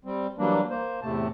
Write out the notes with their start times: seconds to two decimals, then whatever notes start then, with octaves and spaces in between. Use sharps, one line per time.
0.05 G3 C4
0.38 E3 F#3 G3 A#3 D4
0.70 A#3 C5
1.02 E2 A2 C3 A3 A5